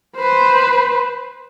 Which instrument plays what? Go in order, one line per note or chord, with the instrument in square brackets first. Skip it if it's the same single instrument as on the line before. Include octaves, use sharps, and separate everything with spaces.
[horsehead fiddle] B4 C5